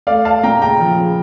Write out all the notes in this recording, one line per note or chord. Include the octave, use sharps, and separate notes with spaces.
A3 D5 F5
A3 F5 A5
A#2 G5 A#5
C#3 G5 A#5
F3
C#3